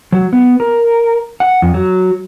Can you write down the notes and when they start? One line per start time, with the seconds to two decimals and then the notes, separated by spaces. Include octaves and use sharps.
0.12 F#3
0.33 B3
0.60 A#4
1.40 F#5
1.62 F2
1.74 F#3